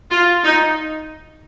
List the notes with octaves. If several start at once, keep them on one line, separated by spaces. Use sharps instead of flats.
F4
D#4